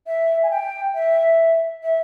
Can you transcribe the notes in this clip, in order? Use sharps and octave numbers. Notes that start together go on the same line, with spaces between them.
E5
G#5
G5
E5
E5